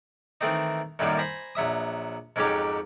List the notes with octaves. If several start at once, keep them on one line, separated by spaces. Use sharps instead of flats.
D#3 E3 A3 C4 D#4
F#2 A2 D#3 F#3 G3 A#3
C5 G#5 A#5 B5
A#1 F#3 E5 D#6
F2 G#2 F#3 C#4 G4 D6